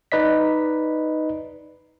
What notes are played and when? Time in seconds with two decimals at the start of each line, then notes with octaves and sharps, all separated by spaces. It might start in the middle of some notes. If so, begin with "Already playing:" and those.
0.12 D#4 B4 D5 D#5 B6